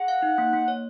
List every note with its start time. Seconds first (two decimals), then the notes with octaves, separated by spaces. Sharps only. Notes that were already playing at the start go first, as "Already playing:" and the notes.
Already playing: G#4 F#5
0.08 F5
0.22 D#4
0.38 A#3
0.53 A#3
0.68 C#5